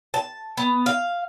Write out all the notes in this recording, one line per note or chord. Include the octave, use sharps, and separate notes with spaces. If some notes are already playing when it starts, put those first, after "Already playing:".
A5
B3
F5